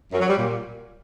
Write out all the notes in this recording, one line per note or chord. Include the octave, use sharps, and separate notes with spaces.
F#2
F#3
G3
A#2